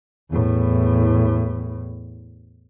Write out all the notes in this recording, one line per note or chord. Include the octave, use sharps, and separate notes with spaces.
E2 A2